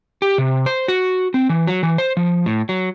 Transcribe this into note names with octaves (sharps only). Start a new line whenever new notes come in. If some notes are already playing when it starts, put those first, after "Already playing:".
G4
C3
C5
F#4
C4
E3
F#3
E3
C5
F3
A2
F#3